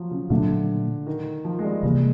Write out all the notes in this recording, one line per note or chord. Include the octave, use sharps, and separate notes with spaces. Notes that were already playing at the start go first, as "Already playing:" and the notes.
Already playing: F3 F#3
C#3
A#2 D3 F#3 A3 D4
D#3
F3
G#3
G3
C3 E3 G3 G#3 A#3